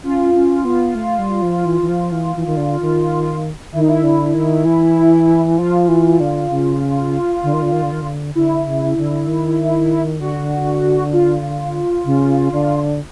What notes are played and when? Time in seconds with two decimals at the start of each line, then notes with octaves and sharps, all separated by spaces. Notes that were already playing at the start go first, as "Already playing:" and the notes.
0.04 C#4 F4
0.34 C#4
0.65 B3
0.95 A3
1.19 G3
1.42 F3
1.65 E3
1.82 E3
1.89 F3
2.12 E3
2.36 E3
2.46 D#3
2.57 D3
2.81 D#3
3.73 D#3 E4
3.81 D#4
3.88 E4
4.03 D3
4.34 D#3
4.65 E3
5.57 F3 F4
5.88 E3
6.20 D3
6.50 C#3
7.43 D3
7.53 D#3
7.62 D3
7.72 D#3
7.83 D3
7.92 D#3
8.02 D3
8.35 D3 E4
8.67 C#3
8.97 D3
9.28 D#3
10.20 D3 F#4
11.13 F4
12.05 C#3
12.52 D3